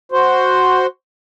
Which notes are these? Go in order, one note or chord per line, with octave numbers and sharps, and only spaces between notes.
F#4 C5